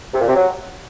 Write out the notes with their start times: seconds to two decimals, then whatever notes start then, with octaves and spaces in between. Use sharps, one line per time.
0.14 C3
0.21 A#2
0.28 C3
0.35 F#3